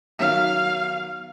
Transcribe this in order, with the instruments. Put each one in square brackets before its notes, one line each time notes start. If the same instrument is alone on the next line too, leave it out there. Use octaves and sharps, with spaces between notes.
[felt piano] D#3 F#3 B3 [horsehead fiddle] F5